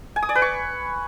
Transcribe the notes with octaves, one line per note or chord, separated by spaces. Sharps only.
G#5
D#6
D5
B4
C#6